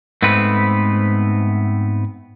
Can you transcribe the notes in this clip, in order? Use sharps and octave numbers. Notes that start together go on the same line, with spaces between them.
G#2 A3 B3 C4 B4